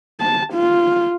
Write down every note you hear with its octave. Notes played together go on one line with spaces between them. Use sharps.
A5
F4